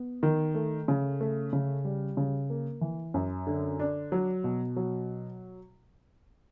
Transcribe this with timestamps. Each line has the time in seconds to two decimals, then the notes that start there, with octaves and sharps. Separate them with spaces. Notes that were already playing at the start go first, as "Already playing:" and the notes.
Already playing: B3
0.23 D#3
0.55 A3
0.88 C#3
1.21 A3
1.53 C#3
1.85 G3
2.17 C#3
2.50 A#3
2.81 E3
3.14 F#2
3.47 D3
3.80 D4
4.12 F#3
4.44 B2
4.76 F#3